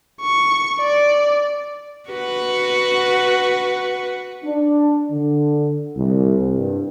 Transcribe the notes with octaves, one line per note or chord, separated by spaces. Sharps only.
C#6
D5
F#4 B4
D4
D3
C2
G2